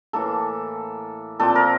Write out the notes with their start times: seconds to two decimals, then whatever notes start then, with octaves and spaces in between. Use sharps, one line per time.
0.13 A2 E3 A#3 A4
1.40 A#2 F3 C4 A4
1.55 A#4